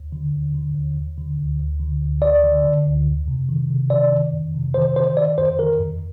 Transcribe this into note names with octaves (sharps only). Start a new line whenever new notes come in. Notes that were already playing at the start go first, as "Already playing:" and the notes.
Already playing: D#2
D3
D#2
D3
D#2
D#2
D3
D2
D2
D3
D2
D2 D5
D3
D3
D2
F2
C3
D#3
C3
D#3 D5
D#3
F2
C3
D#3 C5
D#3 C5
D#3 D5
F2 C5
D#3 A#4
F2